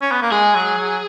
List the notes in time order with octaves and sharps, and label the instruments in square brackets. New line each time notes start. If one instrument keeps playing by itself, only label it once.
[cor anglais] C#4
B3
A#3
[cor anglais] G#3 [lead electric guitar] G#4
[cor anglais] F#3
F#3